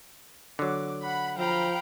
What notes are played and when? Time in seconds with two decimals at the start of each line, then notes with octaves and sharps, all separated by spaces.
0.59 D3 F#3 D6
1.04 F#5 B5
1.38 F3 F5 G5 A#5 B5